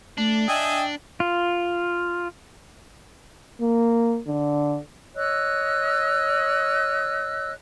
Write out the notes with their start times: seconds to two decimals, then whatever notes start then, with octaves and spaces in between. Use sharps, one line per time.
0.18 A3 D4
0.48 D#5 E5 G5 G#5
1.20 F4
3.61 A#3
4.28 D3
5.15 C#5 D#5 E6 F#6